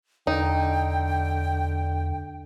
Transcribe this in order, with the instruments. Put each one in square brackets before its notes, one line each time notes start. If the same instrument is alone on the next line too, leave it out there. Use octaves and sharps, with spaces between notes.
[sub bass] E2 [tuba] D3 [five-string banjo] D#4 [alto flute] G5